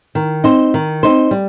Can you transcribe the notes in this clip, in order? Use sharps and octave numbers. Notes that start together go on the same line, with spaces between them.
D#3
C4 D#4 C5
D#3
C4 D#4 C5
G3